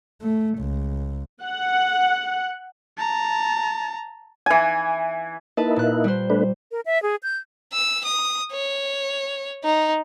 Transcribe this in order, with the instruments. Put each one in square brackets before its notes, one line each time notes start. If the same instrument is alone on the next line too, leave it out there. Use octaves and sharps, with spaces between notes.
[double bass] A3
C#2
[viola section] F#5
[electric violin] A5 A#5
[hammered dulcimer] E3 G#5
[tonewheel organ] A#3 D#4 E4 [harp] B4 A5
[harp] A#2 F#6
G3 C5
[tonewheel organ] A3 D4 B4
[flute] A#4
E5
G#4
G6
[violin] E6
D#6
C#5
D#4